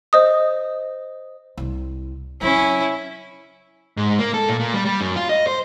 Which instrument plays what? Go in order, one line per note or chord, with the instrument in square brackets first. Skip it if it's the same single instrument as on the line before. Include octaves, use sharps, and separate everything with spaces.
[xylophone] C5 D#5 D#6
[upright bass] C2 C3
[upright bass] C#3 F#3 [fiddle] C#4 E4
[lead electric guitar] G#2
A#3
A4
A#2
A#2
G3
G3
F#2
F4
D#5
C5